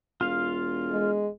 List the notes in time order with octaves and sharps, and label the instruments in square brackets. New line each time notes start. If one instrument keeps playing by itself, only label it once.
[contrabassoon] E1 [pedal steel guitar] F4 F5
[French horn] G#3